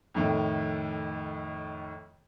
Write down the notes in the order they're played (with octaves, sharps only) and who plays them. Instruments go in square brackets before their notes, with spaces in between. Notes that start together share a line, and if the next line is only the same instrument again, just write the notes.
[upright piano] F2 A2 D#3